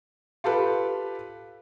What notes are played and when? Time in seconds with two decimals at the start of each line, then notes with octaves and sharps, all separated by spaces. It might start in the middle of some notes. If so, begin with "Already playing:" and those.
0.44 F4 G4 A4 B4